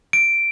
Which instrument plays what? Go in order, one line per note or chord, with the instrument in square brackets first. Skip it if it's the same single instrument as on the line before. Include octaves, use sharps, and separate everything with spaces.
[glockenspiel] D7